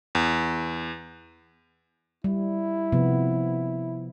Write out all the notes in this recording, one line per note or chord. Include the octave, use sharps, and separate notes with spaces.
E2
G3 E4
C3 F3 B3